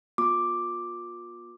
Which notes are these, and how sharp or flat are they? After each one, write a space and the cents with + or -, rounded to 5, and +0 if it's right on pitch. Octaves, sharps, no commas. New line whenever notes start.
B3 -40 F4 +30 D6 +0